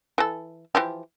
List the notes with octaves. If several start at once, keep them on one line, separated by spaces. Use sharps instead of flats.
E3 A4
E3 F3 G4